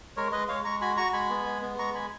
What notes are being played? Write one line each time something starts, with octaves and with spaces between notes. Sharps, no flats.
G#3 A#4 C#5
G#3 B4 D#5
G#3 C#5 F5
G#3 A#5 C#6
F#4 G#5 B5
F#4 A#5 C#6
G#3 G#5 B5
B3
G#3
B3
G#3 A#5 C#6
G#3 G#5 B5